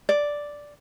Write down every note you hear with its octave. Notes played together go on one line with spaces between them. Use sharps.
D5